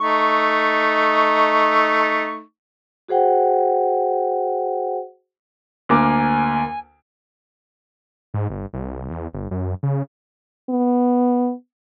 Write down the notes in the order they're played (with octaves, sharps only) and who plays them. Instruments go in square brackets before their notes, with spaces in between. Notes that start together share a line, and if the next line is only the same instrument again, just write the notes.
[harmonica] A3 D#4 C#6
[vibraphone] F#4 G#4 C5 F#5 G5
[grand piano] D2 A#3 D6 [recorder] G#5
[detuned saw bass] G#2
G1
C2
E2
G1
F#2
C#3
[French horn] B3